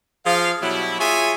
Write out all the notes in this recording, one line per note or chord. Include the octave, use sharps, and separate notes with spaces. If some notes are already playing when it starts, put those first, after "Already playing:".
F3 G#4 F5
B2 F#3 G3 E4
F4 G#4 C#5 E5 G#5